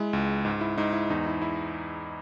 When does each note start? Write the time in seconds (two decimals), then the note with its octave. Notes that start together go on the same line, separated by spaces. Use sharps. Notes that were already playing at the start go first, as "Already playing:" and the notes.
Already playing: G#3 E4
0.13 C#2
0.45 G#2
0.61 E4
0.78 G#2 D#4
0.93 E4
1.10 E2 D#4
1.26 E4
1.42 E4